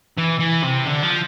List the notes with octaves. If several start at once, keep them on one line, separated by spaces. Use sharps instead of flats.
E3
E3
C3
D3
F3